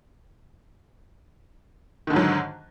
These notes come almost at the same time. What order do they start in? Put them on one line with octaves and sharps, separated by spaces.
D#3 D3 G#2 F#3